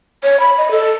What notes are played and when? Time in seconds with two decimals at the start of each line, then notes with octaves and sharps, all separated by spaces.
0.23 C#5
0.40 B5
0.58 D#5
0.71 A4